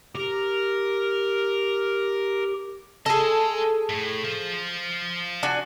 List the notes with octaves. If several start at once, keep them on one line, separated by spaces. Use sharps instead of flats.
G4 A#4
G#4 A4 D#5 G#5
A2
F4 C5
D4 F#4 G#5